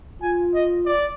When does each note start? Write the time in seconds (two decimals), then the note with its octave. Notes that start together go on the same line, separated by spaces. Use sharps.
0.21 F4 G#5
0.54 D#5
0.86 D5